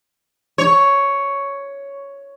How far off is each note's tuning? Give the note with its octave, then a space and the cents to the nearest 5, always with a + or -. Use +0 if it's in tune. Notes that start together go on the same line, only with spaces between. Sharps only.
C#5 +5